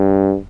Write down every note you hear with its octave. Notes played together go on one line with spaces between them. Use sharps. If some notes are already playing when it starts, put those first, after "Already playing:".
Already playing: G2